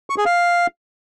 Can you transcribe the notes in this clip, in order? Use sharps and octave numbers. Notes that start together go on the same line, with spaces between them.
C#6
G#4
F5